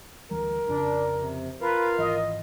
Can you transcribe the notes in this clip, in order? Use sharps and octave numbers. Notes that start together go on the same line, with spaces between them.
D2 E3 G3 A#4
F2 C#3 F3 D4
C3
F4 A#4 B4 F5
G#1 E3 D#5